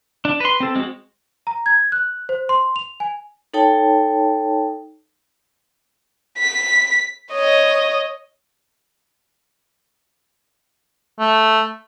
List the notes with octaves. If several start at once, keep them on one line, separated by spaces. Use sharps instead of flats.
D4
B4 C6
C4 A4
G#3 C4 F#4
A#5
G#6
F#6
C5
C6
F7
G#5
D#4 A4 C#5 G5 A5
B6
C#5 D#5
A3